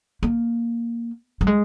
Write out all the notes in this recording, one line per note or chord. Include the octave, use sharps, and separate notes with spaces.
A#3
G3
G#3